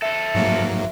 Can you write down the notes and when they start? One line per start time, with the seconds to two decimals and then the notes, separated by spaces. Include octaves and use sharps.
0.02 A4 C5 E5
0.35 G#2 F#3 A#3